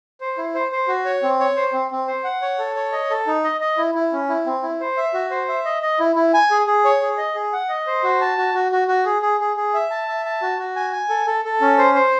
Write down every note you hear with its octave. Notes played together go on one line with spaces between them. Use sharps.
C5
E4
C5
C5
F#4
C#5
C4
C#5
C5
C4
C4
C5
F#5
C#5
A4
C#5
D#5
A4
D#4
D#5
D#5
E4
E4
C#4
E4
C4
E4
C5
E5
F#4
C5
E5
D#5
D#5
E4
E4
G#5
G#4
G#4
C#5
G#4
D#5
G#4
F#5
D#5
C5
F#4
A5
F#4
F#4
F#4
F#4
G#4
G#4
G#4
G#4
E5
A5
E5
A5
F#4
F#4
G#5
G#5
A4
A4
A4
C#4
C5
C5